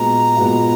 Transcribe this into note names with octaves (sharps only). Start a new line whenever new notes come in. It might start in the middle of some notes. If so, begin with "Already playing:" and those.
Already playing: A#2 G#3 B3 F#4 A#5
A#2 G#3 B3 F#4